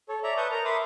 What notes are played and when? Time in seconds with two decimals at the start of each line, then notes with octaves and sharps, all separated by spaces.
0.09 A4 C#5
0.24 C#5 D5 E5 A#5
0.37 B4 A5 C#6 D#6 G6
0.51 A#4 A#5
0.65 E5 B5 C6 D6 D#6